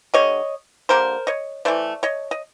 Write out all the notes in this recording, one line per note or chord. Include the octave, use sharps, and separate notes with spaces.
D3 G3 C#5 D#5
D3 G3 A#3 A#4 C5
C#5 D#5
E3 A3 C5 D5
C#5 D#5
D#5